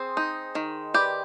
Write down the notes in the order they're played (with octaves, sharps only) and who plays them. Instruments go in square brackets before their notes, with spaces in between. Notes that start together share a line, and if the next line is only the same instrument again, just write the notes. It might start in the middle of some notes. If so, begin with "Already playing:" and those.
Already playing: [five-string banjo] C4 [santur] G#4 C5
[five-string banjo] D#4
D#3
[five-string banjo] G4 [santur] B4 D5